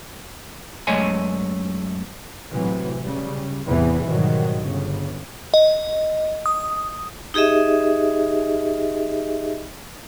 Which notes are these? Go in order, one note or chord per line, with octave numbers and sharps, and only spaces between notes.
F#2 G#3 A3 C#5 D#5 G#5
A2 C3 E3 F#3
C#3 G3
E2 A2 C3 E3
G#2 B2 D#3 F#3 G3
G1 C#3
D#5
D#6
D#4 G4 G#4 D#5 E5